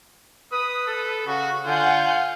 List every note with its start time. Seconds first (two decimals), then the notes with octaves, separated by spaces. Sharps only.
0.52 B4 D#6
0.87 A4
1.27 C#3 F#4
1.66 D3 F4 F#5 G#5 G6